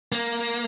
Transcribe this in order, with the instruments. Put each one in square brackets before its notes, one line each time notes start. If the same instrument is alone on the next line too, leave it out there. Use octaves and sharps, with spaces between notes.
[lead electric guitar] A#3